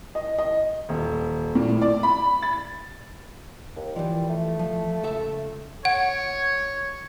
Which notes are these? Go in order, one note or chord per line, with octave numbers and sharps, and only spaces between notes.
D#5
D#5
D#1
A#2
A2
D5
B5
A6
D#2
E3 F3 G3
A3
F3
C#2 A4 E5
C#5 F#5